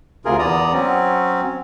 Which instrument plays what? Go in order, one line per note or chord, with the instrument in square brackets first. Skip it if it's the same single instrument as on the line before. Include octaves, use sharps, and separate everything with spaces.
[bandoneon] D2 C3 F4 G#4 A#4
E2 B3 D5 A#5 D#6
F#3 C4 C#4